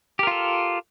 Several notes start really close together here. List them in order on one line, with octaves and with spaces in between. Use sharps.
G4 A#4 F4 A4